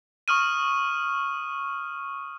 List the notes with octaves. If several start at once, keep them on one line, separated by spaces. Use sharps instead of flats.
C#6 D#6 F6 D#7